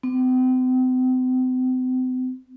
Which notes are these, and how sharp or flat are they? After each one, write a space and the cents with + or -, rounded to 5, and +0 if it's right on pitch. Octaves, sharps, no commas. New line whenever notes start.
C4 -40